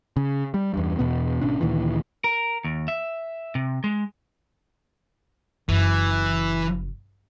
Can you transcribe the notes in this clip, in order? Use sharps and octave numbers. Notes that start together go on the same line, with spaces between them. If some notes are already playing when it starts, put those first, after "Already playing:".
C#3
G3
E2 G2
E2 B2 B3
G#1 B2 C#4 D4
D2 A#2 D#3 E3
A#4
D#2
E5
C3
G#3
F#1 E3